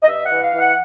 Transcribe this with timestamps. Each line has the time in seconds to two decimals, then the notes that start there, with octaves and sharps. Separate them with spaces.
0.02 D#5
0.07 G2 E5
0.25 F#5
0.31 E3
0.43 F5
0.53 E3
0.60 F#5